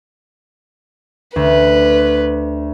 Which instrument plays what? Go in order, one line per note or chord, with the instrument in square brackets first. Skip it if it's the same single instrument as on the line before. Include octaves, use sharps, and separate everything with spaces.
[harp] D2 [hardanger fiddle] B4